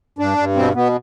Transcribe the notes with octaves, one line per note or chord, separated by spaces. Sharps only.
G2 D4
G2
B2 C4
B2 B3